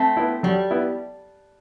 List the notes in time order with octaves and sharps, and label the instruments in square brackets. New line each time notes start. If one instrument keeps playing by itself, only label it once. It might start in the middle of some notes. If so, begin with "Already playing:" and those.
Already playing: [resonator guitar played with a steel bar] A3 C4
[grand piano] B3 E4
[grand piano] F#3 [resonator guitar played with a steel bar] G3
[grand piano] B3 E4